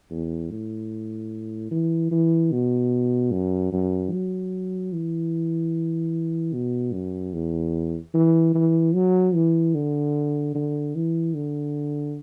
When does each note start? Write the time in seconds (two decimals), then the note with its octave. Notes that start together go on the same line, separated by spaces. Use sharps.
0.11 E2
0.51 A2
1.71 E3
2.11 E3
2.52 B2
3.32 F#2
3.72 F#2
4.12 F#3
4.93 E3
6.53 B2
6.93 F#2
7.33 E2
8.14 E3
8.55 E3
8.94 F#3
9.35 E3
9.75 D3
10.55 D3
10.95 E3
11.35 D3